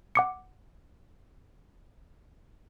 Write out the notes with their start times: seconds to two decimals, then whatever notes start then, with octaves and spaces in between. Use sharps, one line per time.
0.15 F#5 D6 C#7